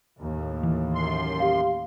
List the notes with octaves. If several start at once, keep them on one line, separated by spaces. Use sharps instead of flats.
D#2 A2
E3
F#2 C6
G4 F5